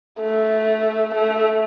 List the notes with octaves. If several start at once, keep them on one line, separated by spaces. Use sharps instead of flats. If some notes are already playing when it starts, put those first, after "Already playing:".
A3
A3